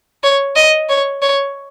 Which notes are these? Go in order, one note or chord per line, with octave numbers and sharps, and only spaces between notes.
C#5
D#5
C#5
C#5